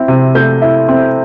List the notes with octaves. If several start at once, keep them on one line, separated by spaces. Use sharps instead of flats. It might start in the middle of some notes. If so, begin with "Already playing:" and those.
Already playing: C4 E4
C3
A3 G6
E4
C4